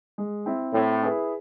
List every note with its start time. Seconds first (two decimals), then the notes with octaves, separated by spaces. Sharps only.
0.18 G#3
0.46 C4 E4
0.74 A2 C4
1.02 E4 G#4 B4